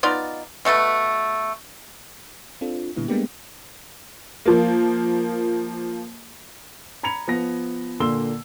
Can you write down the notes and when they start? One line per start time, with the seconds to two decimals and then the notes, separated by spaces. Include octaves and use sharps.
0.03 B3 D#4 F4 D5
0.65 B2 A3 A4 B4
2.61 C4 D4 F4 A4
2.96 A#2 D3 G3 B3 E4
3.08 G3 G#3 A#3 B3 D4 G4
4.46 F3 A#3
7.03 A#5 B5 G#6 C#7 F7
7.28 F3 B3 A#6
8.00 A#2 D3 A#3 C6 E6 G7